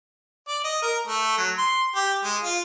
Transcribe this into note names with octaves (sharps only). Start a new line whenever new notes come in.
D5
D#5
A#4
A3
F#3
C6
G4
G#3
F4